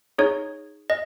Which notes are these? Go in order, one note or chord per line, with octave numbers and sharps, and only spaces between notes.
D#4 G#4 C#5
D#5